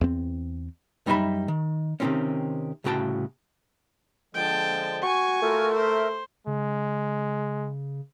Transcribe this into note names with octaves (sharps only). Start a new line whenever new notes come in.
E2 C4
F#2 G3 D#4 C#5 E5 B5
D#3
C3 D#3 E3 F#3 C4 C#4
C2 A2 C#3 F#4 G5 A5
D3 F3 G#3 G5 A5
F#4 G#5 C#6
A3 F4 F#4 A#4
A#4 C5 E5
C#3 G#3